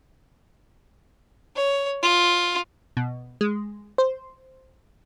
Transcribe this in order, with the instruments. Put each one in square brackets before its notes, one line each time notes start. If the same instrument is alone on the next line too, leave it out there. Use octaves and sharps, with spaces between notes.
[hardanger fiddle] C#5
F4
[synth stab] B2
G#3
C5